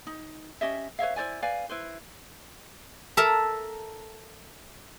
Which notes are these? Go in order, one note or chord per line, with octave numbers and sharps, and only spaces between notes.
D#4
C#4 G4 D#5 E5
B4 C#5 E5 F5
E4 C5 D5 G#5
B4 D5 F5 G#5
E4 B4 C5
A4 A#4 E5 A#5